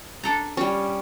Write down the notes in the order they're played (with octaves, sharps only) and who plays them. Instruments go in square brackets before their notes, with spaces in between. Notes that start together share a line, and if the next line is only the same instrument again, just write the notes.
[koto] D4 A4 A#5
[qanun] G3 C#4